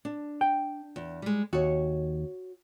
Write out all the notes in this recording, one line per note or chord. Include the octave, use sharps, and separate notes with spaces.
D4
G5
E2
G3 G#3
D#2 F#4 C#5